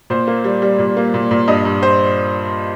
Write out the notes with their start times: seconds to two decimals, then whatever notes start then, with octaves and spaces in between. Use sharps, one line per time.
0.10 A#2 C5
0.27 A#3
0.44 G3
0.62 G3
0.79 A#2
0.97 A#3
1.14 A#2
1.31 A#2
1.48 G2 D#5
1.65 G2
1.83 C5